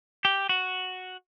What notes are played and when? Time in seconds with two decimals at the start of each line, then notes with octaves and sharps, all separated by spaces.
0.25 G4
0.49 F#4